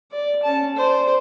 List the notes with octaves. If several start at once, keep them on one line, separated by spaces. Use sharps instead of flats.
D5
C#4 A5
C5 D5